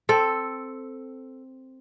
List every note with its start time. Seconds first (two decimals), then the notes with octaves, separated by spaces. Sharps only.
0.09 C4 A4